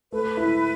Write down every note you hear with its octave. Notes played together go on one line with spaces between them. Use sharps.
A3 B4
E4